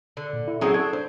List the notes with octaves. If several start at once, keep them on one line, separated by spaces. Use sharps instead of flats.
D3
A#2
E4
F#3 G#3 C4 C#4 E4 D#6
D4 A4 C#6 G#6
D4 C5